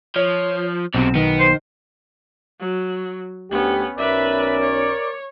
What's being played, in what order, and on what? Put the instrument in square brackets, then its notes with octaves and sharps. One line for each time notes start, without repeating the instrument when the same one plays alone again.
[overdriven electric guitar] F3 [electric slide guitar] C#5
[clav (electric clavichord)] B1 [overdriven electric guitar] G#2 C3 [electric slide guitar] C4
[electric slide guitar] D#3 [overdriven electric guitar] B3
[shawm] C5
[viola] F#3
[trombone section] D2 G4 [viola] B3 C#4
[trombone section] B1 C#4 [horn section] A#4 D5 [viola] B4 E5
[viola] C#5